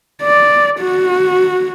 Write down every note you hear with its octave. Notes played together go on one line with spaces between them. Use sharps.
D5
F#4